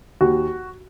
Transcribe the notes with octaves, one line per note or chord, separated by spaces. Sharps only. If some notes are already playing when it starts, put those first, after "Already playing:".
D#2 F#4